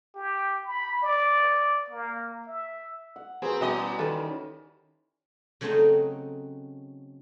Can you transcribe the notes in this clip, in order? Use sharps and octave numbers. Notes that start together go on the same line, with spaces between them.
G4
B5
D5
A#3
E5
F#5
C4 F#4 G#4 A#4 B4
B2 G3 C#4 E4 F#4 D#5
D#2 A4 B4
C#3 F#3 A3 C4 C#4 D#4